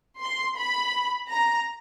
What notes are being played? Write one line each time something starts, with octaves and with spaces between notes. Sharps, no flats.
C6
B5
A#5